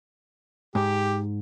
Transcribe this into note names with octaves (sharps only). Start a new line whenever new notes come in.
G#2 G4